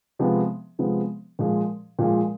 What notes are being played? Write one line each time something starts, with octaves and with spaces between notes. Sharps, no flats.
C3 F3 G#3 B3
C3 F3 G#3 B3
A#2 F3 G#3
A#2 F3 G#3